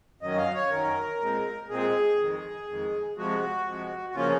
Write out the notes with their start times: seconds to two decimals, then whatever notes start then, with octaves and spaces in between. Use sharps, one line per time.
0.21 F#2 D#3 F#3 C#4 D#5
0.38 F5
0.54 C#5
0.70 F#2 D#3 F#3 C#4 A#4
1.20 A#2 G#3 C4
1.69 A#2 G#3 C4 G#4
2.19 F2 D#3 G#3
2.67 F2 D#3 G#3
3.17 C3 F3 G#3 F#4
3.66 C3 F3 G#3
4.10 F#4
4.15 C#3 F3 A#3 C#4 F4